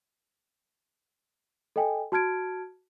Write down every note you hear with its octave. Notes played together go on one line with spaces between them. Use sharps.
A4 D#5 G5 G#5
F#4 A5 F6 G#6 D7